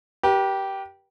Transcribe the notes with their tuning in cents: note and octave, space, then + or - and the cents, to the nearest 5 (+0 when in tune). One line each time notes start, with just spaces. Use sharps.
G4 -10 B4 -45